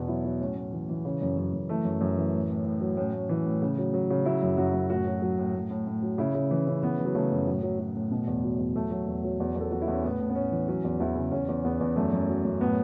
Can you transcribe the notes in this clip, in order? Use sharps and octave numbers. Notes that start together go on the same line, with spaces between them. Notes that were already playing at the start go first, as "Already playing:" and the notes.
Already playing: E2 B2
F#3 E4
F#3
A2 C#4
A2
E3
E3
C#3
F#2
F#2
F#2
E3 A3
F#2
F#2
E3
A2
A2
A2
F#3
A2 C#4
A2
E3
A2
C#3
F#3
F#3
C#3
F#3 E4
F#2
F#2 F#4
F#2
A2 F#4
F#3
F#3
A2
A2
A2
A2
F#3
C#3 E4
C#3
E3
C#3
E3 B3
E3
F#3
C#3 A3
F#2
A2 F#3
F#3
F#3
A2
B2
E2
F#3
E2
F#3 A3
F#3
E2
F#3
E2
E2
A4
E2 F#4
E4
E2
C#4
A2 B3
A2
B3
A2 C#4
E3
F#3 C#4
E2
E2 E4
C#3
E2 C#4
E2
E2 B3
E2
F#2 A3
F#2
F#3
F#2
A2 B3